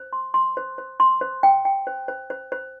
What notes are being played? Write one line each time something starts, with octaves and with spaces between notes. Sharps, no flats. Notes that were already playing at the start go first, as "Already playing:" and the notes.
Already playing: C5
C6
C6
C5
C5
C6
C5
G5
G5
C5
C5
C5
C5